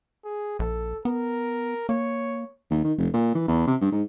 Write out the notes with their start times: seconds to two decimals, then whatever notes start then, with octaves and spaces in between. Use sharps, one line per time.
0.24 G#4
0.59 A#1 A4
1.05 B3 A#4
1.89 A#3 C#5
2.70 D#2
2.84 D#3
2.98 F1
3.13 A#2
3.35 E3
3.48 E2
3.67 C3
3.81 G2
3.92 G#2